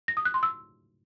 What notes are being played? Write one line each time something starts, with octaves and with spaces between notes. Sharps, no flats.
A#6
D#6
F#6
C6
E6